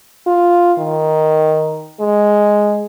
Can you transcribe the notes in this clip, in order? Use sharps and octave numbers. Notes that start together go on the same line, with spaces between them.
F4
D#3
G#3